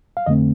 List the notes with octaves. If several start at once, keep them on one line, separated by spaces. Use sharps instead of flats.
F5
F2 D3 A3 C4 D#5